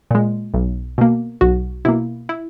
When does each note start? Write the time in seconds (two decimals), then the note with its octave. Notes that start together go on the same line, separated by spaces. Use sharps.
0.11 A#2 G#3
0.54 B1
0.98 B2 A#3
1.41 B1 F#4
1.85 B2 A#3 E4
2.29 E4